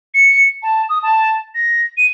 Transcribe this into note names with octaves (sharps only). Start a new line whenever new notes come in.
C#7
A5
D#6
A5
A#6
D#7